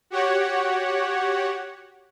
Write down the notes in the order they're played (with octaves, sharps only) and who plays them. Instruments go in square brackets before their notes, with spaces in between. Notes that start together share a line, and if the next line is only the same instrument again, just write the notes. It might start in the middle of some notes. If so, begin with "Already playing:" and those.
[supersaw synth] F#4 G4 C#5 F#5